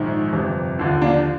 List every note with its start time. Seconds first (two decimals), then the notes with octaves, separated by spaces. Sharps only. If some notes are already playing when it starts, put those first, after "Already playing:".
Already playing: A#1 G#2 D#3
0.33 G1 F2 C3
0.79 D#2 D3 F3
1.01 A#3 D4